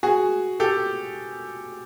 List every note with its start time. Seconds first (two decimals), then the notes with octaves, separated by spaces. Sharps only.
0.03 F#4 G#4
0.60 G4 A4